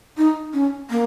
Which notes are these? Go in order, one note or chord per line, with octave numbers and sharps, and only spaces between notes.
D#4
C#4
A#3